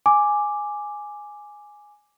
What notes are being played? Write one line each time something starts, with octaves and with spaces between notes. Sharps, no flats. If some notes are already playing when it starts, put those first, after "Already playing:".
G#5 D6